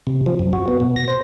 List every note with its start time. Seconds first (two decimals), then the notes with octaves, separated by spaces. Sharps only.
0.07 C3
0.26 F3
0.39 F#2
0.53 F#4
0.68 B3
0.80 B2
0.96 A#6
1.08 C5